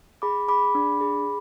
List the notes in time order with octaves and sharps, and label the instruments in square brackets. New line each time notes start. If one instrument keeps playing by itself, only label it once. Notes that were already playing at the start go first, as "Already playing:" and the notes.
[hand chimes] G#4 B5 D6
G#4 B5 D6
D4
G#4